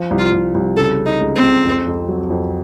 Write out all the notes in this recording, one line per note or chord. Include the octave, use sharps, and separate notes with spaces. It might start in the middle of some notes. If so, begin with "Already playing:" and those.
Already playing: F3
C2
F4
C2
C2
C#3 A4
C#4
D#4
C#2
C4
C#2
F2
F2
F#3
F2